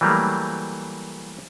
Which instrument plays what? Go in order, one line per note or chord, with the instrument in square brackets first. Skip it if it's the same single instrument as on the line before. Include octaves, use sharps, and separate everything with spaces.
[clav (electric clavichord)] E3 F#3 G3 A3 A#3